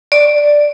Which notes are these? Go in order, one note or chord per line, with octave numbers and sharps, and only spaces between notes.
D5